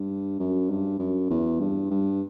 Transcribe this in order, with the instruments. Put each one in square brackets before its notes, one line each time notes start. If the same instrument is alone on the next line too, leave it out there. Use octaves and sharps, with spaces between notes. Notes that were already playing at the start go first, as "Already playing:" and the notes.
Already playing: [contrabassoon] G2
F#2
G2
F#2
E2
G2
G2